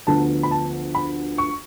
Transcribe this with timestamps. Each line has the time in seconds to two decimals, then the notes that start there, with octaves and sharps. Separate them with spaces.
0.07 D2 D3 F3 B3 A5
0.43 B5
0.51 A5
0.95 B5
1.38 C#6